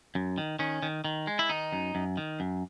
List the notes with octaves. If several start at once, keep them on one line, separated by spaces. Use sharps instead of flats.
F#2
D#3
D#3 C#4
D#3
D#3
G#3
E4
D#3 D#4
F#2
F#2
D#3
F#2